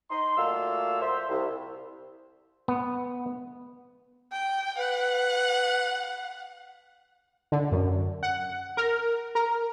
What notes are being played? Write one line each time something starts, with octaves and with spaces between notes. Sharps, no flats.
D#4 C6
A#2 F#3 A3 F5 E6
C5 E5
C2
B3
G5
B4 F#5
D3
F#2
F#5
A#4
A#4